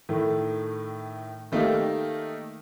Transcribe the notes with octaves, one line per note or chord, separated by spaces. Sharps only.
A2 D#3 A3
D#3 A3 A#3 D#4 G4